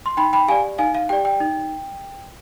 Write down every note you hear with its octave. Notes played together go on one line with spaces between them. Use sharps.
C6
D#4 G5 B5
G5 B5
G4 D5 F5 G#5
D#4 F5 G#5
F5
G4 D5 G5
G5
D#4